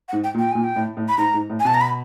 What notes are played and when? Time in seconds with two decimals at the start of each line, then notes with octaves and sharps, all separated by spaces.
0.08 F#5
0.13 G#2
0.24 G5
0.34 A#2
0.39 G5
0.52 A#2 G#5
0.64 G5
0.76 A2
0.97 A2
1.08 B5
1.18 G#2 A#5
1.34 G#2
1.50 A2
1.60 G#5
1.65 B2 A5
1.74 A#5
1.81 B5